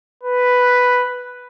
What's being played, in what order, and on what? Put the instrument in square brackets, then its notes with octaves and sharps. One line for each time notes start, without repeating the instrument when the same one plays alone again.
[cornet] B4